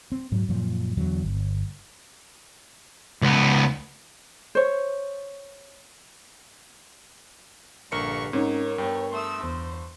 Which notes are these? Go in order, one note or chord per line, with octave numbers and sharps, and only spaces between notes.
C4
G#2 F#3
F#2 A#2 F3
E2 D3 F#3
G1
C#2 B3
C5 C#5
A#1 G2 D3 A#4 C#6 C#7
G#2 C4 C#4 D#4 A#4 C#5
G2 B3 G5
A3 C6 D#6 E6
E2 C5